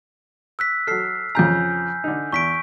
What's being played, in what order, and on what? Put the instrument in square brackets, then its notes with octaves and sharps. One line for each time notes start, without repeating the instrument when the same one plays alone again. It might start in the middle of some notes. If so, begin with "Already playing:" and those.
[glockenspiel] E6 F#6 B6
[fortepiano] F#3 A4 [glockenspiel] F6 C7
[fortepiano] F2 C#3 A#5 [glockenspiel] G#5 G6
[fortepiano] D3 D#4
[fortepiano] E2 [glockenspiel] C#6 B6 D7